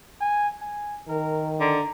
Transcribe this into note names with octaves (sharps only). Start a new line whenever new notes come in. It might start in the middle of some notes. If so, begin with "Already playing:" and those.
G#5
G#5
D#3 A#4
D3 A#5